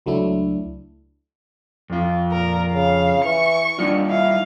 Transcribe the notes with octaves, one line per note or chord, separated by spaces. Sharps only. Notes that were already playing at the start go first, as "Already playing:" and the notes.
C#2 F#3 A3 D4 E4
F2 F4
A#2 A#4
C#3 F5
E3 C#6
G3 D4 D#4 F4
E4 F5